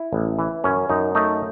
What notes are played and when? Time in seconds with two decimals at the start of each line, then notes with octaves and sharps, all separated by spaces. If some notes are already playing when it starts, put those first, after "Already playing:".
Already playing: E4
0.13 A1
0.39 E3
0.64 F#2 C#4
0.89 F#2 D#4
1.15 A3 D#4